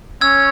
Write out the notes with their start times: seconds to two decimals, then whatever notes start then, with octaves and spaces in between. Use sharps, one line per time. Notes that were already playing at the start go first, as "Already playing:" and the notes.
0.21 C#4 E6 G#6